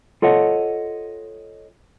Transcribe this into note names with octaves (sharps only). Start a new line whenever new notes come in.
F4 A4 C#5 D#5 F#5